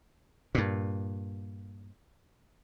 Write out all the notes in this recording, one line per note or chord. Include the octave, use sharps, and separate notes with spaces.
G2 A#2